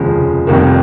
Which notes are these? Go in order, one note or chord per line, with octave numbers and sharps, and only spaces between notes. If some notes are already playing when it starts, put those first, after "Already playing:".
Already playing: F1 D#2 C#3 F3 G#3
F1 F2 D#3 G3 A#3